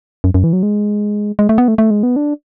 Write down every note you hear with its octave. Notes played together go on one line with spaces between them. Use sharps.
F#2
F#2
E3
F#3
G#3
G#3
A3
B3
A3
A3
G#3
B3
D4